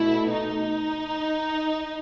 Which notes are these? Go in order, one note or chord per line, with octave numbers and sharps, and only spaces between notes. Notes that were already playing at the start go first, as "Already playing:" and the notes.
Already playing: B2 A3 E4
D#4